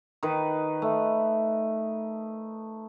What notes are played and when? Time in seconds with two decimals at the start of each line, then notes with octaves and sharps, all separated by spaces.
0.23 D#3 D#4 B4
0.82 A3